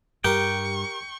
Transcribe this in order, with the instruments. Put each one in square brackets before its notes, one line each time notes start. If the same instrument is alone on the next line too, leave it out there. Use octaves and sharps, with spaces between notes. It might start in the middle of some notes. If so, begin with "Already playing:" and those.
[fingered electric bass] G2 G3 [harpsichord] G4 A#4 F#5 [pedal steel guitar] G5 [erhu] C#6